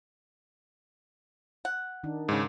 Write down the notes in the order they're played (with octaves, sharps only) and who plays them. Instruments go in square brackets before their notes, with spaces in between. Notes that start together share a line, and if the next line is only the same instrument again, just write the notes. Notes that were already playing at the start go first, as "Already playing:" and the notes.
[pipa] F#5
[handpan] D#3 D4 D#4
[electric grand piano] G#2 C#3